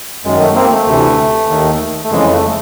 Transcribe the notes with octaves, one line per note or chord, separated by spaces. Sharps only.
F#2 D#3 G#3
A3
A#3 C4
A3
D2 C3 E3
D#2 D#3
A3
F2 C#3 E3 G#3
A3